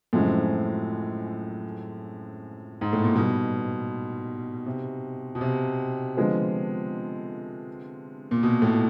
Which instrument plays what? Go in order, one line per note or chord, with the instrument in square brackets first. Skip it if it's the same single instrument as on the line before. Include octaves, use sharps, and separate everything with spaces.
[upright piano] F#2 C#3 F3 G#3 C4 [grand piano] A2
[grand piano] G#2
A2
A#2
[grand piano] B2 [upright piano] D#3 G3 B3
[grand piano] C3
B2
C3
[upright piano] D3 F3 G#3 B3
[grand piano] A#2
B2
A2